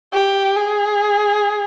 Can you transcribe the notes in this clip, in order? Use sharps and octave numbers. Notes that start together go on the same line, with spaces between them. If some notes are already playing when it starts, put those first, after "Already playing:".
G4
G#4